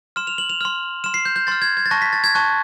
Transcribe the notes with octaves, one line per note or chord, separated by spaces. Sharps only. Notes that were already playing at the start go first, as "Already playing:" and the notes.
C6 F6 E7
F7
F#7
F7
C6 F6
C6 F6 E7
C7
G6
G6
C6 F6 A6
G#6
G#6
A6
A5 C#6 F#6 A#6
B6
A6
G#6
A5 C#6 F#6